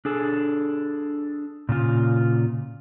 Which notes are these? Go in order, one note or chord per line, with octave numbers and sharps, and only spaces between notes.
D4 G#4 A4
A#2 C#3 F4